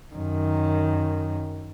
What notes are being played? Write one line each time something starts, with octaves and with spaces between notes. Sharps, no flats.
F#2 D#3